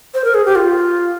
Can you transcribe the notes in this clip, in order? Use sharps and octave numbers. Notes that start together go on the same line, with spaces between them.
C5
A#4
G#4
G4
F4